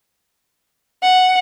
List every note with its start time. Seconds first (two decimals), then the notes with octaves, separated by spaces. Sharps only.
1.03 F#5